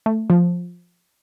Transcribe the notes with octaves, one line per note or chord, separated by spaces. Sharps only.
A3
F3